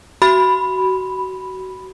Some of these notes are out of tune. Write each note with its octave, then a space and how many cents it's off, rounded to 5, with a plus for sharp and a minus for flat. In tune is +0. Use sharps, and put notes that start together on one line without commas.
F#4 +25 B5 +0